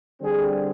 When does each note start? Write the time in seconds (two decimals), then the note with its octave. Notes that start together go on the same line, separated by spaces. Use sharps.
0.20 D3 G3 C4 G#4